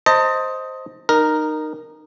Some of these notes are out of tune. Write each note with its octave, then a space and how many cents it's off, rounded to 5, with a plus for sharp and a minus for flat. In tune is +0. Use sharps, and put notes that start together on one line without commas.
C5 +0 D#5 +10 A5 +40
D#4 -20 A#4 +0